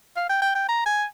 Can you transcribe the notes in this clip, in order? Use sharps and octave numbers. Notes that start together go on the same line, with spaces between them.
F5
G5
G5
G5
A#5
G#5